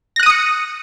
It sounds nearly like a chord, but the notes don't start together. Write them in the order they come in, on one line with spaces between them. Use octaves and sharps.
A#6 F#6 D#7 D#6 C#7